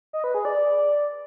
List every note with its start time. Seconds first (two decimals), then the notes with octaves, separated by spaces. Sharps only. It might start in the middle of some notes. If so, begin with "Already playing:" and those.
0.13 D#5
0.24 B4
0.34 G#4
0.45 D5